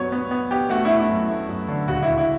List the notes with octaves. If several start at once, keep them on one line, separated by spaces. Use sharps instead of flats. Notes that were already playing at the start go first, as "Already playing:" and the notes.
Already playing: G2 F#3 B3 C#5
B3
B3
B3 G4
A3 F#4
A3 E4
E4
F#2
A3
F#2
D3
C#2 F#4
C#2 E4
E4